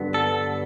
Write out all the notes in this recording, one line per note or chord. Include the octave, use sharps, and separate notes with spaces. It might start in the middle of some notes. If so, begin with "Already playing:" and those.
Already playing: G2 D3 F#3 B3
A4